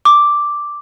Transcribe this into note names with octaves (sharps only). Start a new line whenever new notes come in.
D6